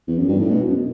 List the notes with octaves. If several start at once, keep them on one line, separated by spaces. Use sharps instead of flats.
E2
F#2
G2
A2
B2
F#2